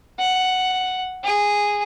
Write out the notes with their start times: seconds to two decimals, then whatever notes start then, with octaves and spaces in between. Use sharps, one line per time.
0.19 F#5
1.24 G#4